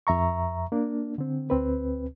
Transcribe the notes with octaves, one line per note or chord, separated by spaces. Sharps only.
F2 E5 A#5 C#6
A#3 D4
D3 C4
D2 C4 B4